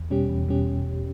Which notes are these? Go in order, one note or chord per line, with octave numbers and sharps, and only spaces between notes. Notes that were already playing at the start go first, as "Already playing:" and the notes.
Already playing: E2
B2 G3 C#4 G4
E2
B2 G3 C#4 G4